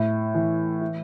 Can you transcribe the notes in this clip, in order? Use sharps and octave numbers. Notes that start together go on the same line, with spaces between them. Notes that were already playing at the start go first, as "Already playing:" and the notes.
Already playing: A2
E3
E4